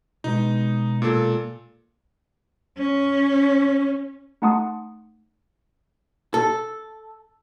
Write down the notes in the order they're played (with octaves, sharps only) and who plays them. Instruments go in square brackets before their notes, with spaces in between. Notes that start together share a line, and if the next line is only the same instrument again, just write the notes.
[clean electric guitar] B2 G#3 B4 [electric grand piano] D#4
[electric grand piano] A#2 A4
[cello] C#4
[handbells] A3 D#4 F#5 A5 C6 D#6
[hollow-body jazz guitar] A4